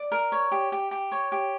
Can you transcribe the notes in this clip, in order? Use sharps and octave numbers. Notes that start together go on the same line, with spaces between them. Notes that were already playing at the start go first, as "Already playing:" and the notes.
Already playing: D5
A#4
C#5
G4
G4
G4
C#5
G4